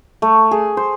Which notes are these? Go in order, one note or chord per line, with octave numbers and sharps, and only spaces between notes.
A3
G#4
C5